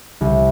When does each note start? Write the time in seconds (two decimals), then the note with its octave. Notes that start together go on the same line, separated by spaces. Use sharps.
0.21 C2